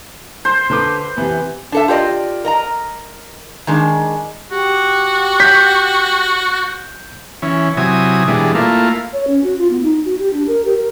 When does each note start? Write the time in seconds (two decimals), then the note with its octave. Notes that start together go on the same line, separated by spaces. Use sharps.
0.45 C5
0.70 D3 B4 D6
1.17 C3 E3 B3
1.72 D4 A4 E5
1.88 F4 G4 A4 D5 D#5
2.45 A#4 D#5 A#5
3.67 D#3 G#3 D4
4.51 F#4 G4
5.40 G6 B6
7.42 E3 C#4
7.77 C3 F#3 E4 G#5 D#6
8.28 B2 E3 G3 G#3 D4
8.55 A3 A#3 E4 F4
9.13 C#5
9.27 C#4
9.44 F#4
9.59 F4
9.71 B3
9.83 D#4
10.05 F#4
10.19 G4
10.33 D4
10.48 A#4
10.65 G4
10.77 A#4